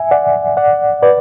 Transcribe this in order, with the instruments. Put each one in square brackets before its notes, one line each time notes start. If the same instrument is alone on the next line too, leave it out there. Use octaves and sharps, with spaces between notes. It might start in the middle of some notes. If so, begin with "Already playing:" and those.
Already playing: [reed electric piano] E5 G#5
D5 F#5
D5 F#5
B4 D5